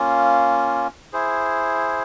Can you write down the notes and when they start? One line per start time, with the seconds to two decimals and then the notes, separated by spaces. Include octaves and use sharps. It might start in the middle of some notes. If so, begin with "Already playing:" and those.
Already playing: A#3 C#4 F4
1.13 E4 G#4 C5